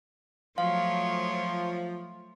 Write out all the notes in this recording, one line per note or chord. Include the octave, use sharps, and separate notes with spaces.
F3 F#3 A3 C#5 F5 C6